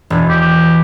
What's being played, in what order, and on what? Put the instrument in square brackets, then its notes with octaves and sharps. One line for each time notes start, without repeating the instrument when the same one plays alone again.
[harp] E1
[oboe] G4